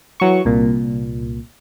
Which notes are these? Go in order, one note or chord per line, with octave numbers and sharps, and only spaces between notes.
E3 F#3 C#6
C2 A#2